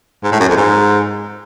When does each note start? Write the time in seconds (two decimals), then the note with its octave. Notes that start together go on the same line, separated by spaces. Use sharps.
0.23 G#2
0.32 A2
0.40 F#2
0.48 F2
0.56 G#2